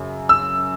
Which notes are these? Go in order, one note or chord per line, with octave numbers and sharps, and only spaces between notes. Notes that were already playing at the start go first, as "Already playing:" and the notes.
Already playing: F#2 C#3
E6